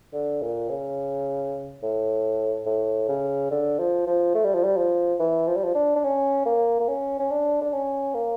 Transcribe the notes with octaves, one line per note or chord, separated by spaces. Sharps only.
D3
A#2
C#3
A2
A2
C#3
D3
F3
F3
A3
G3
F3
G3
F3
E3
F3
G3
F3
D4
D4
C#4
A#3
A#3
C#4
C#4
D4
D4
C#4
A#3